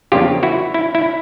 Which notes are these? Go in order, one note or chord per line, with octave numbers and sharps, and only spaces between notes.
E2 C#3 F3 A#3 D4 F4 G4
E4 F#4
E4
E4